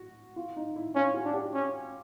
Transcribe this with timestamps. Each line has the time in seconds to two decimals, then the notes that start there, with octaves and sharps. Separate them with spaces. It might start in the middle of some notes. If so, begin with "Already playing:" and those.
Already playing: F#4
0.36 F4
0.56 D#4
0.76 E4
0.95 C#4 F4
1.14 F#4
1.25 D4
1.34 G4
1.54 C#4